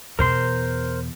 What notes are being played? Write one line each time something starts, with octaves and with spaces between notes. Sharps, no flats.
E2 B2 A#4 C5 C6